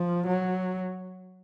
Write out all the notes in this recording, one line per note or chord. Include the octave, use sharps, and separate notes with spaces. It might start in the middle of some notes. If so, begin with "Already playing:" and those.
Already playing: F3
F#3